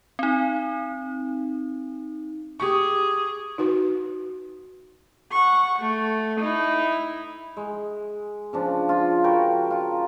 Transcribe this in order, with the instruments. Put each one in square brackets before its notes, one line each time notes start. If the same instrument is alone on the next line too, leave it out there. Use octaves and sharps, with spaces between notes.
[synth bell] C4 D#4
[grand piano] G4 C#6 [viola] G#4
[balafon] D#4 F#4 B4
[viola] F#5 C#6
A3
D#4 E4
[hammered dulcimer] G#3
C#3 F3 D4
F4
F#4 A#4 B4 G5
F4